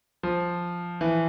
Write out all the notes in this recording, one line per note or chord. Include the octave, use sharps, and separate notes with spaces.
F3
E3